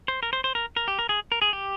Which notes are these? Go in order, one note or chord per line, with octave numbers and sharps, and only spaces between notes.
C5
A#4
C5
C5
A#4
A#4
G4
A#4
G#4
A#4
G#4
G4